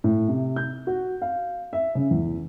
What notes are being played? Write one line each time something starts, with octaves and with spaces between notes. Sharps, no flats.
A2
C3
G6
F#4
F5
E5
C#3
E2